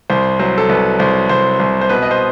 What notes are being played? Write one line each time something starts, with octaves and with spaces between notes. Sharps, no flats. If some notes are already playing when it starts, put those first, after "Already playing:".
C2 C5
F#3 C5
A4
C2 B4
C2 C5
C2 C5
C2
C5
B2 B4
D#5
C5